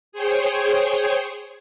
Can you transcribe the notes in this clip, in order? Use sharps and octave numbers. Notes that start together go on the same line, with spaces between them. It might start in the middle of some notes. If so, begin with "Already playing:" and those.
G#4 C5 C#5 G5